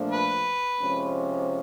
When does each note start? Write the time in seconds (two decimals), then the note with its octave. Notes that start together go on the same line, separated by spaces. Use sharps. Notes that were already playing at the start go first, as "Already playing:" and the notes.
Already playing: A#2 F3 A3 D4
0.11 B4
0.81 C3 F3 G#3 C#4